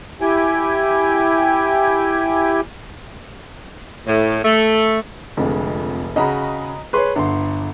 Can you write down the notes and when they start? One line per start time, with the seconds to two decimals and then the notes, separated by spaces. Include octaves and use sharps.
0.21 E4 G4 G5 G#5
4.05 A2
4.43 A3
5.37 F1 F2 D3 G#3
6.16 C#3 F#4 D#5 A#5 B5
6.93 G#4 B4 C#5 C6
7.16 G1 D3 B4 C6